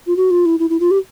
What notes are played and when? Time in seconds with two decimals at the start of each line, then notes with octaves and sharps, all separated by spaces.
0.07 F4
0.16 F#4
0.30 F4
0.45 E4
0.59 E4
0.70 E4
0.80 F4
0.91 G4